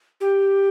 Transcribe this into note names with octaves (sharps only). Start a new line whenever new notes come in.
G4